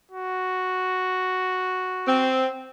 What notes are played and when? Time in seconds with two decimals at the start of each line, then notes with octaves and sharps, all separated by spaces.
0.12 F#4
2.08 C4